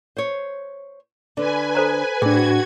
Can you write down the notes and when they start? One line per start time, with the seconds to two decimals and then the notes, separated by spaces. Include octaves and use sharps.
0.17 C5 C#5
1.37 D3 D4 B4 G#5
1.75 A4 C5 A#5
2.22 A2 C4 D4 F#4 G#4 G#6